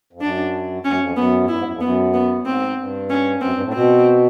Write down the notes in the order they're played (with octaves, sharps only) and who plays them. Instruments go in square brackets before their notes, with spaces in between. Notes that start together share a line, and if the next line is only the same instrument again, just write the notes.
[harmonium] F2
[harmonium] F#2 [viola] D4
[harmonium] F#2 [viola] C#4
[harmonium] F2
[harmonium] F#2 [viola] B3
[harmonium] G#2
[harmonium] G2 [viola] E4
[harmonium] G#2
F#2
F2
[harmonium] F#2 [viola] B3
[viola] B3
[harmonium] G#2 [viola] C4
[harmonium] G2
[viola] C#4
[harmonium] F#2 [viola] C4
[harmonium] G2
A2
[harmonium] B2 [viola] C4